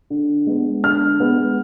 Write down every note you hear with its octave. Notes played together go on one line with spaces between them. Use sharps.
D3
G#3 B3
D3 F6
G#3 B3